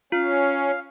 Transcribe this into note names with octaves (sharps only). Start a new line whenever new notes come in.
C#4 F4 F5